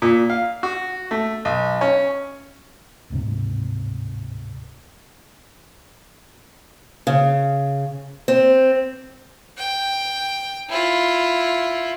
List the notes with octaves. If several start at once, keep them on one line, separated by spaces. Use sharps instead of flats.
A#2
F5
F#4
A3
B1
C#4
D1 G#2 C3
C#3
C4
G5
E4 F4